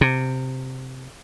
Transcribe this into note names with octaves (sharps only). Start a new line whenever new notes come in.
C3